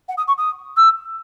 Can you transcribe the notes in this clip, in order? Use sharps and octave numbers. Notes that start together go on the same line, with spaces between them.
F#5
D#6
C#6
D#6
E6